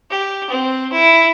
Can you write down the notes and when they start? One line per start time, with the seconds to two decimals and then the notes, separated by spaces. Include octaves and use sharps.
0.10 G4
0.50 C4
0.92 E4